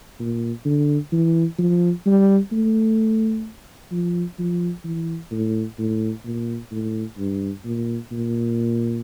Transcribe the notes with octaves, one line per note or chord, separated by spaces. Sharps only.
A#2
D3
E3
F3
G3
A3
F3
F3
E3
A2
A2
A#2
A2
G2
A#2
A#2